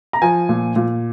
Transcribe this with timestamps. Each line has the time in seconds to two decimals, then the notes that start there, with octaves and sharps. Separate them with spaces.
0.13 A#5
0.22 F3 G#5
0.49 A#2
0.76 A#2